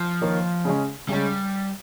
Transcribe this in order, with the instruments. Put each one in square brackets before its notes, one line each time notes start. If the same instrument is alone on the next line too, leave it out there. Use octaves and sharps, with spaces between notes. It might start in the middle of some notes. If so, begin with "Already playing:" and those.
Already playing: [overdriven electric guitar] F3
[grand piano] D#3 A#3 D#4 A#4 C#5
C#3 G#3 C#4
[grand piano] C#3 G#3 C#4 [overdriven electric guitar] G3